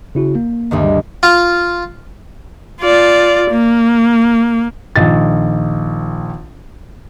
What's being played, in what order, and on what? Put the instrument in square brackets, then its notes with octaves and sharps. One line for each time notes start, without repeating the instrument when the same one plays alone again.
[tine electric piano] C#3 E4 F#4
A#3
[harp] D2 G2 D#3
[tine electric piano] G3
[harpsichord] F4
[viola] F4 D5
A#3
[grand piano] A#1 D#3 A6